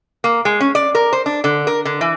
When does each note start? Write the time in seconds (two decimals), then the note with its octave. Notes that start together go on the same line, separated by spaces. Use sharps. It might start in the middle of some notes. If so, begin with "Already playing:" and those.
0.24 A#3
0.45 G#3
0.60 C#4
0.75 D5
0.95 A#4
1.13 C5
1.26 D4
1.44 D3
1.67 A#4
1.85 D3
2.01 E3